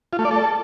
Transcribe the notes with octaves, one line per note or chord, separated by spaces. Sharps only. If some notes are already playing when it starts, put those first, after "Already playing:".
F4
A3
D5
A4